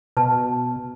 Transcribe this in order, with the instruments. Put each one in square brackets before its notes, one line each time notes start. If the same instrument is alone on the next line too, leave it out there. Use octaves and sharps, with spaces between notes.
[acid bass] B2 [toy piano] B4 A5